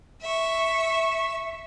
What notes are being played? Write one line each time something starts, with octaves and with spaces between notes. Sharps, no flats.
E5 C#6